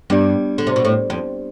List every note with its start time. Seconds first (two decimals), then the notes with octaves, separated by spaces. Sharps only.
0.10 G2 G3 B3 D4 G4 D5
0.58 D3
0.67 C3
0.76 B2
0.85 A2
1.10 F2